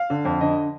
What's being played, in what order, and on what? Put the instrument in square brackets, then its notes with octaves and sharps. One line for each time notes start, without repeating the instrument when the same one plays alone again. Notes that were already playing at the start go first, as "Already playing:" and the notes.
Already playing: [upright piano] F5
D3
F2
D3 D#5